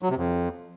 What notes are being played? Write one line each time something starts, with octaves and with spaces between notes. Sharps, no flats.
F#3
C3
F2